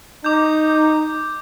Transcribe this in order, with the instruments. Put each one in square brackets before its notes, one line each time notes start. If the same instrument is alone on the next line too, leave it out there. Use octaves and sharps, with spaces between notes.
[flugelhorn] D#4 [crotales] D6 G6